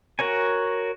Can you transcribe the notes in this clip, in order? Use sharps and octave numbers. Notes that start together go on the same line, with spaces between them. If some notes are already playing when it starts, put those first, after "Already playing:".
F#4 A#4 C#5 G#5